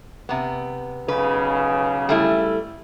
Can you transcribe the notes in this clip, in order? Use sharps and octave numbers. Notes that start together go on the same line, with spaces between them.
C3 B3
B1 C#3 B4
G3 A3 E4